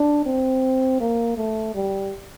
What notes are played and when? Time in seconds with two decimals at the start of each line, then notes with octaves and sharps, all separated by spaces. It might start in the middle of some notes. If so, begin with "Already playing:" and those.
Already playing: D4
0.26 C4
1.00 A#3
1.37 A3
1.75 G3